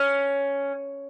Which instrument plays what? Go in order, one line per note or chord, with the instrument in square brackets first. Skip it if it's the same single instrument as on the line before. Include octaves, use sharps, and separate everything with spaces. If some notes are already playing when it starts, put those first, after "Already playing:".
Already playing: [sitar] C#4